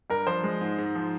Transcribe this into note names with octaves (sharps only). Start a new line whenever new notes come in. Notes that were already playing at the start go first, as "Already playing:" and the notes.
G2 A#4
F3 C5
G#3
G#2
G#2
F3